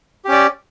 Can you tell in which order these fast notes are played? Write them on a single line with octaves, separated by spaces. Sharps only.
G4 C#4 D5